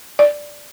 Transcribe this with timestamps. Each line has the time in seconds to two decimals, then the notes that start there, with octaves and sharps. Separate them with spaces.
0.19 D5